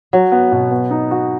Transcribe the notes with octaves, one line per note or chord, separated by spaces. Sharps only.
F#3 F#4
B3
B2
B3
D#4
F#4